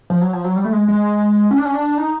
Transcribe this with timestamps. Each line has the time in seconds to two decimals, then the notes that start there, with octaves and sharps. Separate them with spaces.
0.10 F3
0.21 F#3
0.33 F3
0.44 F#3
0.56 G3
0.65 A3
0.73 G#3
0.88 G#3
1.51 C#4
1.58 D4
1.65 C#4
1.74 D4
1.98 D#4